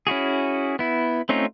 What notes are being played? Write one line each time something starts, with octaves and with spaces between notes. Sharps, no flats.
C#4 E4 F#4 G#4
B3 E4
A3 C4 C#4 D#4 F4